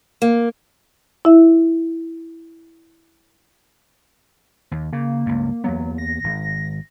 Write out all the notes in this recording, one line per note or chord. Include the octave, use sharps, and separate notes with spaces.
A#3
E4 E5
D#2
C#3 A#3
C#2 G2
E2 F#3 A#3 B3
A#6
G#1